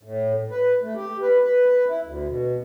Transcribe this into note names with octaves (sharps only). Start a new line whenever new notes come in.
A2
B4
A3
G4
B4
B4
B4
E4
D2
B2